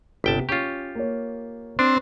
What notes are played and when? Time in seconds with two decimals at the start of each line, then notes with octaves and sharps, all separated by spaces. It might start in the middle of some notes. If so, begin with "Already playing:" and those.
0.24 G1 C3 B3 G5 A5 B6
0.49 C#4 F4 G4 C#5 C#6
0.95 A#3 C#5
1.79 C4 D4